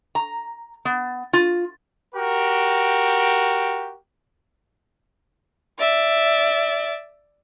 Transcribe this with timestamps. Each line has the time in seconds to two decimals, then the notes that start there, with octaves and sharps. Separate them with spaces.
0.15 A#5
0.85 B3
1.33 F4
2.15 F#4 G4 A#4
5.79 D5 E5